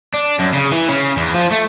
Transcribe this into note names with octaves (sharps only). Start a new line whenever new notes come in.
D4
F#2
C#3
E3
C#3
E2
F3
A3